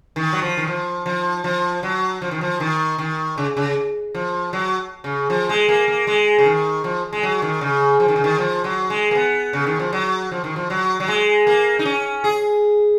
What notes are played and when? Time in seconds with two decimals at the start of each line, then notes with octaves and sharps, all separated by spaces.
0.16 D#3
0.33 F#3
0.42 F3
0.57 D#3
0.67 F3
1.06 F3
1.44 F3
1.83 F#3
2.22 F3
2.31 D#3
2.41 F3
2.60 D#3
2.98 D#3
3.38 C#3
3.57 C#3
4.15 F3
4.53 F#3
5.04 C#3
5.30 F3
5.49 G#3
5.69 A#3
5.88 A#3
6.07 G#3
6.39 C#3
6.46 D#3
6.84 F3
7.13 G#3
7.23 F#3
7.42 D#3
7.61 C#3
8.00 F3
8.08 D#3
8.16 C#3
8.24 D#3
8.38 F3
8.64 F#3
8.90 G#3
9.11 A#3
9.15 B3
9.53 C#3
9.67 D#3
9.79 F3
9.93 F#3
10.31 F3
10.44 D#3
10.56 F3
10.70 F#3
11.00 F#3
11.08 G#3
11.47 A#3
11.79 D#4
11.85 C#4
12.24 G#4